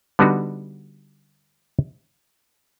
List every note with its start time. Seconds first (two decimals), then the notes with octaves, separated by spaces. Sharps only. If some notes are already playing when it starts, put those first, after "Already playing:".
0.19 D3 G3 B3 D4 D#4 F#4